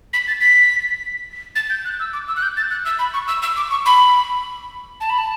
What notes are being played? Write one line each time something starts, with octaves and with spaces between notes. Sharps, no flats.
B6
A6
B6
A6
G6
F#6
E6
D6
E6
F#6
G6
A6
F#6
E6
B5
C#6
E6
E6
D6
C#6
B5
A5
B5
A5